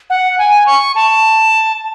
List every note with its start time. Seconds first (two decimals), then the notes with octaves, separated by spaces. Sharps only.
0.10 F#5
0.39 G#5
0.66 C#6
0.95 A5